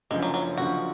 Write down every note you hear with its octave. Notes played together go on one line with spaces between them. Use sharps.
F#1 F#2 D3 F3 G#3
F#3
F#3
F#1 F#2 D3 F3 F#4